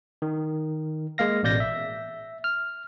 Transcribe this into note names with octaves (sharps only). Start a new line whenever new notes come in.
D#3
G#3 A#3 F5 A#6
A1 B2 D5 G6 A#6
E5
F6